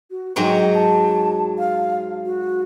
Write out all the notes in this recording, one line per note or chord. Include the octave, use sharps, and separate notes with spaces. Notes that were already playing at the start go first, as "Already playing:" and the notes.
F#4
G#2 F#3 C#5 G5
A5
F5
F#4